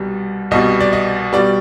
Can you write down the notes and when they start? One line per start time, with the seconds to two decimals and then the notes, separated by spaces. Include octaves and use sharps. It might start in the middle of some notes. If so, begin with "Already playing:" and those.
Already playing: C2 B2 G3
0.51 C2 B2 G3 D#5
0.80 D5
0.93 D#5
1.33 B2 G3 D5